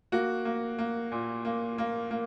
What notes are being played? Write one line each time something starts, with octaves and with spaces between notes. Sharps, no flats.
A#3 F#4
A#3
A#3
A#2
A#3
A#3
A#3